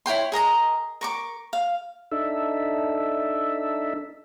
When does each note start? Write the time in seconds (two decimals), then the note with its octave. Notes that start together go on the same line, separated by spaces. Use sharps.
0.06 E4 C#5 G5 C6
0.32 G#4 A#4 D#5 A#5
1.01 A#4 C#6 D6
1.53 F5
2.12 D4 D#4 A4 E5